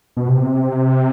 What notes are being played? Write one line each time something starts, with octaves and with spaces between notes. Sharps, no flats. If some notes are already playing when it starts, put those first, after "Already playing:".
B2
C3